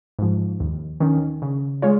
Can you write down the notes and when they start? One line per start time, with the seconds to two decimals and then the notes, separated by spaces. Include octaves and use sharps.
0.19 G#2 F3
0.60 D#2
1.00 D#3 C#4
1.42 C#3
1.82 G#3 F4 C#5